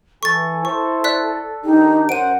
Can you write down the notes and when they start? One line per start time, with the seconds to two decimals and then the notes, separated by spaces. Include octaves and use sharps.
0.23 E3 A4 G#5 C#6 A6
0.65 E4 C5 C#6
1.04 D5 F#6 B6
1.65 D#3 D4 D#4 G4
2.09 F#2 C5 F#5 D7 D#7